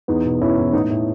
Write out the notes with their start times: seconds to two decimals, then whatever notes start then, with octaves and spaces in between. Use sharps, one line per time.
0.08 E2 B3 D#4
0.25 B2
0.40 E2 C#4 E4
0.58 E2
0.73 A2 B3 D#4
0.90 A2